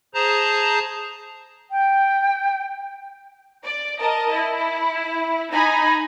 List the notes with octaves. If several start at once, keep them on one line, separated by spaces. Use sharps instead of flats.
G#4 C5 A5 A#5
G5
D5
A#4 D#5 A5
E4
D#4 G#5 A#5 B5